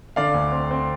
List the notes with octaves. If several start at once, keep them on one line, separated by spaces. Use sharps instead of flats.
D3 D5 F5
D2
C4
C4